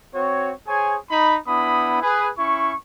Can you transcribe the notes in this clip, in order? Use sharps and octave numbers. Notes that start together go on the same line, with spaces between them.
C4 F#4 C#5
G#4 C5 C#5 G#5
D#4 B5
B3 D4 E4 B5 D#6
G#4 B4
C#4 E4 C#6